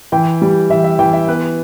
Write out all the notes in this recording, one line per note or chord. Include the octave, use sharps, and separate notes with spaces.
E3 G5
G3
E3 E5
E5
E3 G5
E5
B3 B4